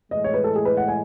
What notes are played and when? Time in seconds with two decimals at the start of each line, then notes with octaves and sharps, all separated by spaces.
0.11 A2 E3 G#3 D#5
0.24 C#5
0.34 B4
0.44 A4
0.56 G#4
0.65 B4
0.77 F#5
0.88 G#5